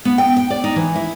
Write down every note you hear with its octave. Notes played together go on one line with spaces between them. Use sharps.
B3
G5
G5
D5
D#4
E3
E4